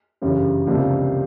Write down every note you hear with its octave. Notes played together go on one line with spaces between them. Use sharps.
G1 F#2 C#3 E3 G3
C#2 C3 F3 A#3 D4